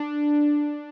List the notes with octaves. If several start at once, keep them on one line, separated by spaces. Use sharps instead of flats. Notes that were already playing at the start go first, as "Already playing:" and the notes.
Already playing: D4